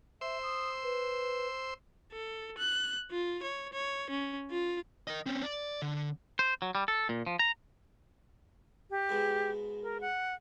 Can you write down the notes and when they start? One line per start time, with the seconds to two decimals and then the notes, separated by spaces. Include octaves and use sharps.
0.21 C5 E5 C6 E6
0.43 D#6
0.84 B4
2.13 A4
2.58 F#6
3.11 F4
3.43 C#5
3.73 C#5
4.10 C#4
4.51 F4
5.07 A#4 D#5
5.26 C4 C#4
5.43 D5
5.82 D3
6.39 C5
6.62 F#3
6.75 G3
6.88 A4
7.09 A#2
7.27 F3
7.39 A#5
8.90 G4
9.09 G#2 B2 G#3
9.83 A#4
10.01 F#5